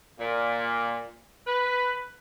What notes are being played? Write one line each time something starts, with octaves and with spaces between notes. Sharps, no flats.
A#2
B4